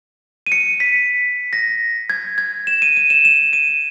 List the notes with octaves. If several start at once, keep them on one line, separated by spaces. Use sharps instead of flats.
D#7
C#7
B6
A#6
G#6
G#6
E7
D#7
D#7
E7
E7
D#7